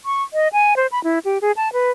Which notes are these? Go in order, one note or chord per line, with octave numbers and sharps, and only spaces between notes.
C#6
D#5
G#5
C5
B5
E4
G4
G#4
A5
B4